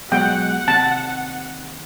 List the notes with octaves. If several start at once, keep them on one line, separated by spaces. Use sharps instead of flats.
B2 F#3 G#3 F#5 G5
D#2 C3 A5